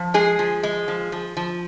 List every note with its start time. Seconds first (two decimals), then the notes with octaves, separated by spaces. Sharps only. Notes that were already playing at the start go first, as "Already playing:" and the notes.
Already playing: F3
0.14 G#3 G#4
0.39 F3
0.63 G#3
0.88 F3
1.12 F3
1.37 F3